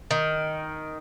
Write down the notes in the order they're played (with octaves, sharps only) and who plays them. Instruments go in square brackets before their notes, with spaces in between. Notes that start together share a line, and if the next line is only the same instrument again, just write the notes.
[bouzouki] D#3